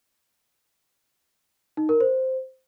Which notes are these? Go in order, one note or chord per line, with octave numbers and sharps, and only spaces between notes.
D#4
A#4
C5